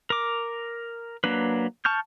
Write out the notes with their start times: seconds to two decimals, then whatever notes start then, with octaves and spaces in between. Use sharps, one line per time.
0.10 A#4 D6
1.24 F#3 A#3 D4 B4
1.85 A5 C#6 F6 G6